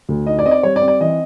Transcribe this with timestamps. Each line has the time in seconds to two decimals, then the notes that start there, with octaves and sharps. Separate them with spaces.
0.09 D2
0.26 D#4 D#5
0.39 D5
0.45 C4 D#5
0.51 D5
0.63 G3 C#5
0.76 D5
0.81 C4
0.88 D5
1.00 E3 D#5